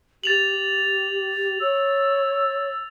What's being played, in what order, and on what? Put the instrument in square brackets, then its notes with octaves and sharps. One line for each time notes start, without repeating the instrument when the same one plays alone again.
[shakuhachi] G4 [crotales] A6 F7 F#7
[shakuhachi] C#5 [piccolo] E6